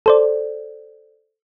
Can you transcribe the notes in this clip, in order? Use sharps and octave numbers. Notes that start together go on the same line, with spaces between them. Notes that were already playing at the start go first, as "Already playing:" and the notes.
A4 C5 D5